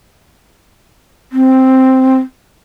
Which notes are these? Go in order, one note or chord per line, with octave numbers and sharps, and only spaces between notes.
C4